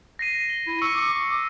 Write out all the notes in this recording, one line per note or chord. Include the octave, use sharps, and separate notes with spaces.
A#6 C7 D#7
G7
E4
C#6 E6
D6 C#7